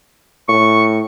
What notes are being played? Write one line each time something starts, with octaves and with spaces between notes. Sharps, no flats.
A2 C#6